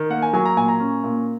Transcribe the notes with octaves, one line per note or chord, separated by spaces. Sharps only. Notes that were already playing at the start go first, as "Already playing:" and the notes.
Already playing: D#3
A#3 F#5
G#5
F#3 G#5
A#5
A#2 G#5
A#5
C#4
A#2